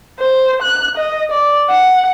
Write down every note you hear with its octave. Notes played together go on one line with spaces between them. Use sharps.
C5
F#6
D#5
D5
F#5